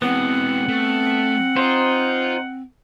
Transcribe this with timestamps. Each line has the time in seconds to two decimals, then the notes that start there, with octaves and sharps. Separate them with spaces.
0.02 E3 G#3 B3 C4 F#5
0.68 A3
1.56 D#4 F4 C5